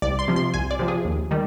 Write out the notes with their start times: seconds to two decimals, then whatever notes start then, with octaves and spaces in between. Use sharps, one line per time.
0.02 C2 D5
0.19 C6
0.28 C3 F3
0.36 C6
0.54 C2 G#5
0.71 D5
0.79 C3 F3
0.88 G#4
1.05 D#2
1.31 D#3 G3